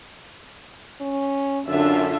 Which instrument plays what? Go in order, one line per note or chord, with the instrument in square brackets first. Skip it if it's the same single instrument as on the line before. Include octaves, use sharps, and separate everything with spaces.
[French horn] C#4
[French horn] F#2 [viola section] D3 F4 E5